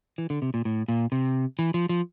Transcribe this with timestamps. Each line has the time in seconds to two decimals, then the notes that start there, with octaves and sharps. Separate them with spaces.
0.18 E3
0.30 D3
0.42 C3
0.54 A#2
0.65 A2
0.88 A#2
1.12 C3
1.59 E3
1.74 F3
1.89 F3